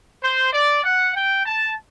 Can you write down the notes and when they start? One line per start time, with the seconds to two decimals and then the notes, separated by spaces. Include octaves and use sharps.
0.22 C5
0.52 D5
0.83 F#5
1.14 G5
1.44 A5